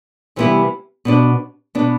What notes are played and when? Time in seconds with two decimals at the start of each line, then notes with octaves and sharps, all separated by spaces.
0.36 C3 E3 G3 B3 E4
1.05 B2 B3 D4
1.75 B2 B3 D4